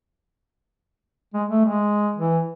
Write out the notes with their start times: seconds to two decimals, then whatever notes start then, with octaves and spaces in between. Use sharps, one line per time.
1.34 G#3
1.49 A3
1.65 G#3
2.16 E3